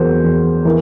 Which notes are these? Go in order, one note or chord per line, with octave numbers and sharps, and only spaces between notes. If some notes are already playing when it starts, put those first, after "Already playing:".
Already playing: E2 F#3 A#4 C5
E2
E3 A#4